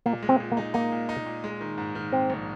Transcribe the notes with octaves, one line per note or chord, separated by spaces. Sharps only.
A#2 A#3
G#3
C4
A#2
A#3
D#4
A#3 D#4
A#2
D#4
A#2
G#3
D#3
G#2
D#3
G#2 C4
A#1